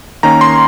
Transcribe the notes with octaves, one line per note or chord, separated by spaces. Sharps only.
D#3 A#3 C#4 A#5
C6